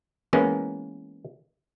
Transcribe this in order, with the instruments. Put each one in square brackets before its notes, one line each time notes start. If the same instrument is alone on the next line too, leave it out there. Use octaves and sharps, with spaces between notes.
[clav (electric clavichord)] E3 G#3 A#3 B3 C#4 A#4